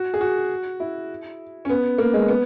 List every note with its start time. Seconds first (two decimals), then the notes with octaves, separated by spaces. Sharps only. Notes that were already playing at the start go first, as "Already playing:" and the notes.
Already playing: F#4
0.14 G#4
0.21 F#4
0.80 E4
1.65 C#4
1.69 B3
1.98 A#3
2.14 G#3
2.28 B3